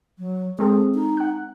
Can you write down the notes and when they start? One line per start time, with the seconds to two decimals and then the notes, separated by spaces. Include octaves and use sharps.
0.19 F#3
0.59 G#3 C4 G#4 A4
0.95 D#4
1.17 F#5 F#6